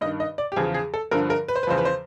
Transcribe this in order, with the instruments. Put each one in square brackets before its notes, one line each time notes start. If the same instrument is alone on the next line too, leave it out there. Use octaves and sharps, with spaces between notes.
[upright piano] G2 D#3 D#5
D#5
D5
G4
E2 C#3 F3 G#4
G#4
A4
G2 D3 F3 A#4
A#4
B4
C5
B4
E2 C#3 F3 C5
B4
C5